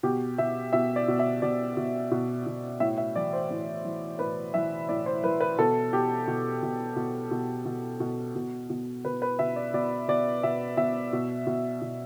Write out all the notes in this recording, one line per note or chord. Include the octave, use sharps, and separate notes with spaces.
B2 G4
B2 E5
B2 E5
D5
B2
E5
B2 D5
B2
B2
B2
A2 E5
E5
E3 D5
C5
A2
E3
A2 B4
E3 E5
A2 D5
C5
E3 B4
B4
B2 A4
B2 G4
B2
B2
B2
B2
B2
B2
B2
B2
B2 B4
B4
B2 E5
D5
B2 D5
B2 D5
B2 E5
B2 E5
B2
B2
B2